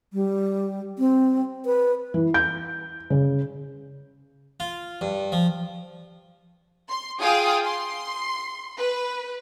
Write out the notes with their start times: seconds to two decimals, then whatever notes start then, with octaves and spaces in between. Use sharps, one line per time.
0.13 G3
0.99 C4
1.66 B4
2.14 E3
2.34 G6
3.10 C#3
4.60 F4
5.01 G2
5.32 F3
6.89 C6
7.20 F4 G#4 F5 G5 D#6
7.63 C6
8.78 B4